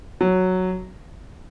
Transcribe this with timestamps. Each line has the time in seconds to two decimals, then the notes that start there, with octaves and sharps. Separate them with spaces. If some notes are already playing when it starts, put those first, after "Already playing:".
0.21 F#3